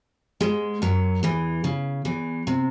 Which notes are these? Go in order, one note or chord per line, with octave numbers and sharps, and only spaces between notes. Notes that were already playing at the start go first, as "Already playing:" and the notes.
G#2 G#3
F#2 F#3
E2 E3
C#3
E2 E3
C3